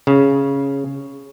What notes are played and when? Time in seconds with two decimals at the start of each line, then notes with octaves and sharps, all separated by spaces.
0.07 C#3